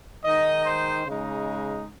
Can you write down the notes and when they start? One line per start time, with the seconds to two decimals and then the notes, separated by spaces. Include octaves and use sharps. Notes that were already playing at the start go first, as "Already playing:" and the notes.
0.24 D#3 G#3 D#4 D#5
0.65 C5
1.06 C#3 G#3 D#4